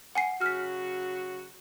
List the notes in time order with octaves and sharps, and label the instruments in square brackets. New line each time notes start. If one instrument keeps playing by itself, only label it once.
[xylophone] F#5 G#5 C7
[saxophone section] C#3 F#3 F#4 [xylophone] F6 B6